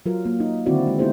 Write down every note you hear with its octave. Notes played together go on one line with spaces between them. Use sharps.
F#3 F4 A#4
A#3
D#4
D3 D#3 C4 E4 F#4 D5
G#3
A3 B3 D#4 E4 G4 C5